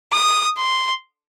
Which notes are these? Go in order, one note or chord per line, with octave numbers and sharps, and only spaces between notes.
D#6
C6